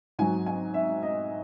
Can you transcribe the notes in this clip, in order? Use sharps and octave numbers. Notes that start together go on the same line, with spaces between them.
G#2 F#3 G#5
G#5
E5
D#5